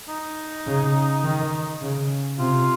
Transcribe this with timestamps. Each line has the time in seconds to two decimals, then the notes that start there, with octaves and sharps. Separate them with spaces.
0.09 D#4
0.66 C#3
1.23 D#3
1.81 C#3
2.38 C3 F4